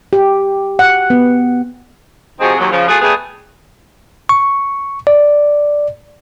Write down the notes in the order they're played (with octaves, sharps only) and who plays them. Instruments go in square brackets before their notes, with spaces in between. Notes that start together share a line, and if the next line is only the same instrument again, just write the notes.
[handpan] G4
F#5
B3
[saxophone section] C3 F3 C4 D#4 F#4 G#4
D#2 F#3
C#3 F3
A3 F4 F#4 G#4
G3 A3 B3 G#4
[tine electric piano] C#6
D5